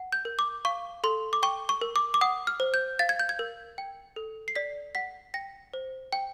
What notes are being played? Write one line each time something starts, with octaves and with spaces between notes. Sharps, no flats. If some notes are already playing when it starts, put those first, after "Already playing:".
Already playing: F#5
G6
A#4
D6
F5 C#6
A4 C6
D6
G5 C#6
C#6
A#4
D6
D6
F#5 D#6
F6
C5
G6
F5 A6
G#6
G6
G#6
A#4
G5
A4
C7
D5 B6
F#5 B6
G5 A#6
C5
G5